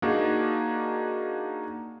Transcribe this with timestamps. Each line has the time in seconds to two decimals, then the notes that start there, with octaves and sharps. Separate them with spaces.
0.02 A#3 D4 D#4 F#4 G#4